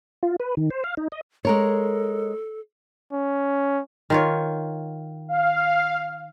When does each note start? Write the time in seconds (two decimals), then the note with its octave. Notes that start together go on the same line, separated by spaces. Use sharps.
0.23 F4
0.40 B4
0.57 D#3
0.70 C5
0.84 F5
0.97 D#4
1.12 D#5
1.45 G#3 A4 A#4 C#5
3.13 C#4
4.10 D#3 F4 C#5
5.28 F5